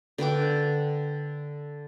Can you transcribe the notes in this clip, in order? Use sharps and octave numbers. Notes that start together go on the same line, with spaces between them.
D3 B4 G5 D6